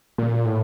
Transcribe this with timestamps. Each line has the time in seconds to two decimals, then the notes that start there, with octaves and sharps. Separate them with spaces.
0.18 A#2
0.46 A2